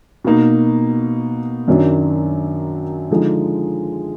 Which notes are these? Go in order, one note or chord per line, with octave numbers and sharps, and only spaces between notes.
B2 A#3 D#4
F#2 D#3 F#3 D4
D3 F3 G#3 D#4